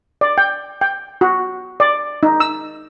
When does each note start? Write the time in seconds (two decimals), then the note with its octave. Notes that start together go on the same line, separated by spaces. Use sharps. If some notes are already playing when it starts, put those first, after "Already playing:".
0.21 D5
0.38 G5
0.81 G5
1.21 F#4
1.80 D5
2.23 D#4
2.40 E6